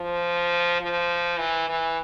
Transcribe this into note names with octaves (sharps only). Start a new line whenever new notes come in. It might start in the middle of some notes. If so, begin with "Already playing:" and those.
Already playing: F3
F3
E3
E3